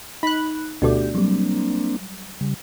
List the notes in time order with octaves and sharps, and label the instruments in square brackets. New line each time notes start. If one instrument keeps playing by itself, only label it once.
[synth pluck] D#4 [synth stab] B5 F#6
[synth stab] D2 B2 A3 [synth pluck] D4 F#4 D5 [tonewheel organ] G4
[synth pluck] F#3 G3 [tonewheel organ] A#3 C4 D4
[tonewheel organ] C#3 G3